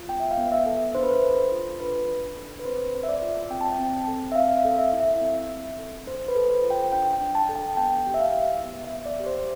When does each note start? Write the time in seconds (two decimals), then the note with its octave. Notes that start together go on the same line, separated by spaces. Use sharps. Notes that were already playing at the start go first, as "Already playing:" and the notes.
Already playing: F4
0.09 B3 G5
0.20 E5
0.31 F5
0.37 B3
0.52 E5
0.66 A4
0.95 D4 C5
1.03 B4
1.11 C5
1.23 A4
1.51 F4
1.80 D4 B4
2.08 D4
2.37 A4
2.59 B4
2.65 C4 C5
2.94 A4
3.03 E5
3.09 D5
3.22 F4
3.50 C4 G5
3.61 A5
3.72 G5
3.79 C4
4.08 A4
4.32 E5
4.35 C4 F5
4.57 F5
4.65 A4
4.78 E5
4.93 E4
5.00 E5
5.21 C4
5.50 C4
5.78 A4
6.06 D4 C5
6.28 B4
6.35 A4
6.50 C5
6.64 F4
6.70 G5
6.93 D4 G5
7.13 G5
7.21 D4
7.35 A5
7.49 A4
7.56 G5
7.77 B3 G5
8.06 G4
8.14 E5
8.20 F5
8.34 E4
8.63 B3
8.84 E5
8.91 B3
9.06 D5
9.20 G4
9.26 C5